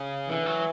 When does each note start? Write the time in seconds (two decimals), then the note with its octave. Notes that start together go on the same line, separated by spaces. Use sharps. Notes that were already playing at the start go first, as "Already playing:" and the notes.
Already playing: C#3
0.29 D3 E3
0.46 F#3